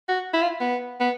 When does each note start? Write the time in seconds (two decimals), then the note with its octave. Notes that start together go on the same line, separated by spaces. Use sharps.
0.08 F#4
0.33 E4
0.42 F4
0.60 B3
1.00 B3